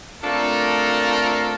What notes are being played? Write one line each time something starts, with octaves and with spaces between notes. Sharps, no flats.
A3 C4 D4 F4 A4 A#4